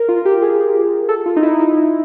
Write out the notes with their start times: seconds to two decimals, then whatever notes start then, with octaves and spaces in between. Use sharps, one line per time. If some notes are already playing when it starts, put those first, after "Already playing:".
Already playing: A#4
0.09 F4
0.25 G4
0.42 G#4
1.09 A4
1.26 F4
1.36 D#4
1.43 E4
1.59 D#4
1.77 E4